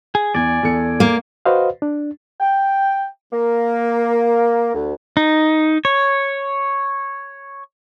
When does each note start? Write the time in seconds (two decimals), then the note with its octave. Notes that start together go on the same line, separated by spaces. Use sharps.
0.15 G#4
0.35 E2 D5 G#5
0.63 E2 A4 C#7
1.00 A#3
1.46 F#4 B4 C5 D#5 F5
1.82 D4
2.41 G5
3.32 A#3
4.74 D2
5.17 D#4
5.85 C#5